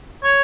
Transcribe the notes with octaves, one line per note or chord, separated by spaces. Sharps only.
C#5